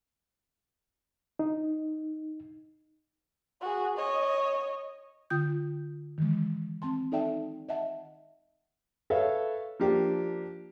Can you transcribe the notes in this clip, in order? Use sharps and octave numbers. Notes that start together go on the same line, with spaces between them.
D#4
F#4 G#4
C#5 D#5
D3 F4 G5 D#6 G6
D#3 E3 G#3
C4 A5 C6
D#4 A4 D5 E5 G5 A5
D#5 E5 F#5 A5
A4 B4 C#5 E5 F5
F3 A#3 D4 G4